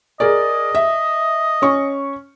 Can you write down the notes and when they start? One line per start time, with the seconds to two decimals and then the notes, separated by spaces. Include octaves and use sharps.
0.20 G#4 A#4 D5 D#5
0.75 E5
1.62 C#4 C#6